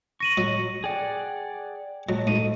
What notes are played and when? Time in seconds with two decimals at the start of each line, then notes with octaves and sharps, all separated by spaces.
0.20 C#6 A#6 D#7 F#7
0.38 F#3
0.84 G#4 D5 F#5 G5
2.09 F#3 A3
2.27 G#2 D#7